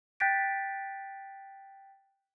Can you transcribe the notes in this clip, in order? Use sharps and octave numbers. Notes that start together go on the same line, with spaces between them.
G5 F#6 G6 A6 B6 D7